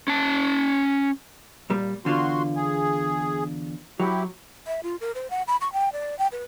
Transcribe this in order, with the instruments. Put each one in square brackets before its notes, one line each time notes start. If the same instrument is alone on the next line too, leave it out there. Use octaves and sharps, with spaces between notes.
[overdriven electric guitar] C#4 A5
[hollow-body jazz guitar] A#2 G3
[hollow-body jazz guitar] E2 D3 F4 [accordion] F#4 C6
[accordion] G#4
[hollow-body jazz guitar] F#3 [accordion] E4 G4
[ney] E5
F4
A#4
C5
F#5
B5
C#6
G5
D5
G5
B4